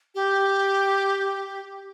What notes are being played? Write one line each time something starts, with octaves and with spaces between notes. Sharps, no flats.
G4